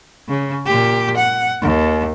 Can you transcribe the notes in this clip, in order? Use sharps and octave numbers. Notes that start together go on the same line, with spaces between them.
C#3
A#2 G4
F#5
D#2